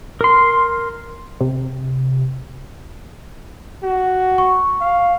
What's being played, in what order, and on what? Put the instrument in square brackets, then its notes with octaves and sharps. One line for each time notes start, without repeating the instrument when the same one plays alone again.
[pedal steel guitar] A#4 C6
[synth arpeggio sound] C3
[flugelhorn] F#4
[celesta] C#6
[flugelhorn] F5